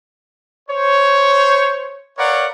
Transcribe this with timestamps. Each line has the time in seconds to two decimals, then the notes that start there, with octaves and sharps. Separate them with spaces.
0.69 C5 C#5
2.17 A#4 B4 C#5 D5 F5 F#5